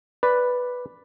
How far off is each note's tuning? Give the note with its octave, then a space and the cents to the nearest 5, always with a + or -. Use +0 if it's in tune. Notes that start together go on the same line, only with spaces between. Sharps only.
B4 +0 D5 +0